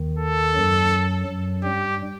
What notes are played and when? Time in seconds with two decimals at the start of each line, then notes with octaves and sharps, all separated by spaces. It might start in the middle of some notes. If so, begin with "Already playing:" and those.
Already playing: D#2 D#3
0.18 A4
0.55 F#2 F#3
1.27 F#2 F#3
1.63 G2 G3 G4